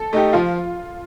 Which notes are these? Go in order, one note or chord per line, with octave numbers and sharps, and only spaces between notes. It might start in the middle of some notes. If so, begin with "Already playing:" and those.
Already playing: A4
A3 D#4 G4
F3 F4